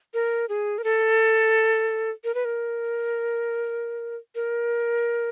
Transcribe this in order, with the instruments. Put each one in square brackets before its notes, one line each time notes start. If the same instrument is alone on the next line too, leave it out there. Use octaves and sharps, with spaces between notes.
[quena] A#4
G#4
A#4
A4
A#4
B4
A#4
A#4